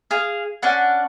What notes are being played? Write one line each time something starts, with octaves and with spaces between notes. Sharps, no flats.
G#4 F5
C#4 D4 F#5